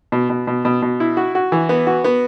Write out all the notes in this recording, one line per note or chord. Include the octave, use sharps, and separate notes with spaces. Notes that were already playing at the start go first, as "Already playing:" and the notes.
B2
B2
B2
B2
B2
E4
F#4
F#4
E3
B3
F#4
B3